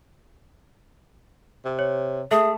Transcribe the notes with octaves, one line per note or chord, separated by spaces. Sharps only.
C3
C#5
A3 G#4 E5